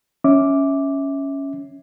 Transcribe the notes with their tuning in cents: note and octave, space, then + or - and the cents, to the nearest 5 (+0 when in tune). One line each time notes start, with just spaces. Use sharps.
C#4 +0 E5 -20 D6 +0